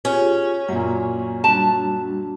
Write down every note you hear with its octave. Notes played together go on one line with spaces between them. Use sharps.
C#4 F4 G4 G#4
F#2 A#2 G#5
G3 D4 F#4 A5